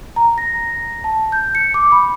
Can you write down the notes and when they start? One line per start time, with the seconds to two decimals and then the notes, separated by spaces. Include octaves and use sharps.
0.16 A#5
0.38 A#6
1.04 A5
1.32 G6
1.55 C#7
1.74 D6
1.92 B5